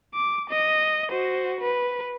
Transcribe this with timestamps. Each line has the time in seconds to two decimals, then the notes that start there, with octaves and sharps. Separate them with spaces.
0.14 D6
0.50 D#5
1.10 F#4 C5
1.61 B4